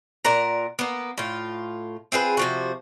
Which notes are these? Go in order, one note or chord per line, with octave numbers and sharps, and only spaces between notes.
A#2 A#4 F#5 A#5
A#3 B3
A2 F4
C4 F4 G#4 B4
C3 F3 F#4